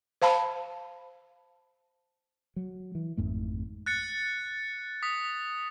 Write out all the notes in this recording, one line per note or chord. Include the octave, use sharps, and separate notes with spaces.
C5 F5 A5 B5
F#3
E3
G#1 F2 G#2 A3
F#6 A6 C#7
D#6 B6